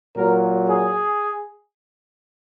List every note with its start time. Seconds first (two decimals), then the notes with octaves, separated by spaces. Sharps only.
0.17 A#2 F#3 A#4
0.70 G#4